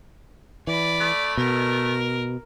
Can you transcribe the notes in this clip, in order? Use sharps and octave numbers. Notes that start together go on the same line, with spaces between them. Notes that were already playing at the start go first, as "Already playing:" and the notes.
E3 D5 B5
A3
B2 A#4